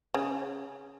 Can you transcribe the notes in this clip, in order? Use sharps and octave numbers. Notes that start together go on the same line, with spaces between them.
C#3